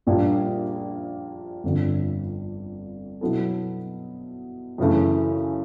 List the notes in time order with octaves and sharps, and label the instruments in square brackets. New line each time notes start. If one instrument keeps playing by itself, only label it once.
[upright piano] A#1 A#2 G3 A#3 D4
G1 F2 D3
B2 F#3 B3 E4 A4
F#2 C#3 E3 A3